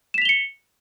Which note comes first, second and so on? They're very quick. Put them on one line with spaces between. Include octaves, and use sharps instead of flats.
E7 B6 F7 G7 C#7